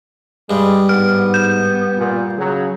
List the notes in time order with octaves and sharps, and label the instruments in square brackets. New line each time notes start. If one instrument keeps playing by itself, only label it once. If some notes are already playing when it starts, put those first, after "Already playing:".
[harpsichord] G2 G3 [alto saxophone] G#3
[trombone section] G#2 [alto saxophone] B3 [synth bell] F6
[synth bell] G6
[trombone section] A#2
C#3 F#3